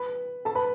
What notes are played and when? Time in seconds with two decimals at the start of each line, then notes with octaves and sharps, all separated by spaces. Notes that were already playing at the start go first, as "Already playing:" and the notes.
Already playing: B4 B5
0.45 A4 A5
0.55 B4 B5